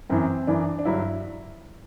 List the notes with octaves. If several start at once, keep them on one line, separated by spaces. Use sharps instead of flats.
F#2 E3 C4
F#2 E3 D4
D4
G2 D3 F#3 E4